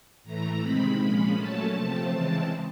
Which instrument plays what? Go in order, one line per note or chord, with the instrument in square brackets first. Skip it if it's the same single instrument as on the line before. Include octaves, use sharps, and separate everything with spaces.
[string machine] A2 E3 A3 A#5
C3 D#3 G#3 C4 B5
A#2 F3 G#3 C#4 B5
A#2 F#3 A3 C#4 A5
C3 F3 A3 C4
C#3 E3 G#3 C4